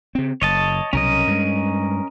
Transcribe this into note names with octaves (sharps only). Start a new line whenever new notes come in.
C#3 C4
F#1 C#5 D#5 A5
C2 B2 F#3 C#4 A#4 D#5
G2 G#3